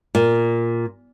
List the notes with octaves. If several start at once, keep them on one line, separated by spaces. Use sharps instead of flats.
A#2